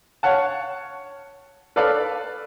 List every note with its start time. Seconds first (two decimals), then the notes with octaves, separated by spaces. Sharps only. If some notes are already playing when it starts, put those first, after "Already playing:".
0.23 C#5 F5 F#5 A5
1.76 A4 B4 C#5 D5 F5 A5